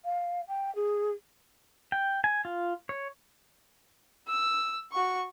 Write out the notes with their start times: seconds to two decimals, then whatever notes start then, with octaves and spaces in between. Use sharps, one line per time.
0.05 F5
0.48 G5
0.75 G#4
1.92 G5
2.24 G#5
2.45 F4
2.89 C#5
4.28 E6
4.93 F#4 C#6